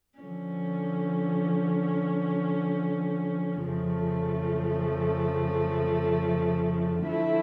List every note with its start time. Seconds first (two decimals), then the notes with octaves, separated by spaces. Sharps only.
0.19 D3 F3 C#4
3.63 F2 C#3 F3 A3
7.06 D3 F3 A3 E4